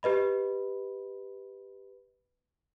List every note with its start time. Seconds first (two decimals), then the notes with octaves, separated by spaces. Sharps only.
0.03 G4 B4 D#5 B5